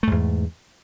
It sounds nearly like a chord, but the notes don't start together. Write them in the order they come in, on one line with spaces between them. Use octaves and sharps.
A3 G#2 E2